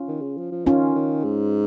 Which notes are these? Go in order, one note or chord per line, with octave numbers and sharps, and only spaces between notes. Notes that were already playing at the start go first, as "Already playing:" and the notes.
Already playing: C#4 F4
D#3
C#3
F3
F3
D#3 C#4 F4
D#3
G#2